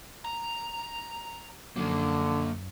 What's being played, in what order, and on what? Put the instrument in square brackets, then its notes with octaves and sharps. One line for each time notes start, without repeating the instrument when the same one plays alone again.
[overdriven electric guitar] A#5
[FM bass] F#2 [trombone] D3 [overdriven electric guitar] F3 A#3